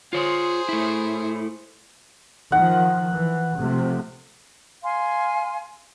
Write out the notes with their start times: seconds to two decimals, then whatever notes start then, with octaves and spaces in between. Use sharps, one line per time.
0.13 F4 G#4 C5 C#5
0.69 A3 E4
2.52 D#3 F3 F#5
3.12 E3
3.57 C3 F3 A3
4.83 F5 G#5 C6